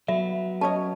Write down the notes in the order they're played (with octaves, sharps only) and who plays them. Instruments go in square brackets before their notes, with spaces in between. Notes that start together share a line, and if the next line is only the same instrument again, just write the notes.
[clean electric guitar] F#3 B3 [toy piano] E5
[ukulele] C#4 C#5 D#5 [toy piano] A5